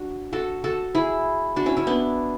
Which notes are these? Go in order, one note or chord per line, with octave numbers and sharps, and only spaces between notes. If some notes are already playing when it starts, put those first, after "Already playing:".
Already playing: D4 F#4
F#4 A4
F#4 A4
E4 G#4
D4 F#4
C#4 E4
C#4 E4
B3 D4